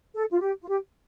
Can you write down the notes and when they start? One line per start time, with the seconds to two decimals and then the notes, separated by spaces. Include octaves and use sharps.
0.15 A4
0.30 F4
0.41 G4
0.61 F4
0.68 G4